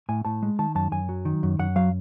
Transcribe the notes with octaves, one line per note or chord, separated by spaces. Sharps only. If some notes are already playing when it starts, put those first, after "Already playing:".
A2 G#5
A2 A5
G#3
D#3 A5
F#2 A5
F#2 G#5
F#3
D#3
F#2
F#2 F#5
F#3 F5